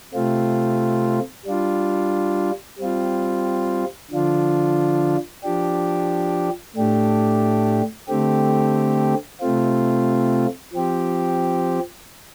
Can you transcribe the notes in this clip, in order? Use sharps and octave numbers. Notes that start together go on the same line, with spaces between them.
C3 A3 C4 F4
G3 D4 F4
G3 C4 F4
D3 F3 D4 F4
F3 D4 G4
A2 A3 D4 G4
D3 A3 C4 G4
C3 A3 C4 F4
F3 C4 G4